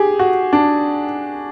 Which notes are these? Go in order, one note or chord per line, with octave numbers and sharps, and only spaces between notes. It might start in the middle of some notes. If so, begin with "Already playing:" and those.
Already playing: G4 G#4
F#4
D4